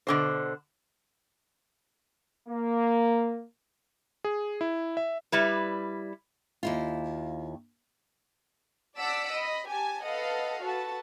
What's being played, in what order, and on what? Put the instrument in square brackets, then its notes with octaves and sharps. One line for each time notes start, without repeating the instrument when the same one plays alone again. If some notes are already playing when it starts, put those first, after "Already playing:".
[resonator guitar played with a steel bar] B2 D3 C5
[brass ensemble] A#3
[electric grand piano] G#4
E4
E5
[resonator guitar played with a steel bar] G3 E4 B4
[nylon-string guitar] D#2 E4 F4
[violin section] D5 F#5 A5 E6 B6 D7
D#5 B5
G4 G#5 A5
A4 B4 D#5 F5 F#5
F#4 A4 B4 A5